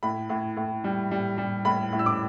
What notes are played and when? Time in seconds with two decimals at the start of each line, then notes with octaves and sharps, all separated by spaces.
0.03 A2 B5
0.29 A2
0.57 A2
0.84 G3
1.11 G3
1.38 G3
1.65 A2 B5
1.92 A2
1.99 E6
2.06 D6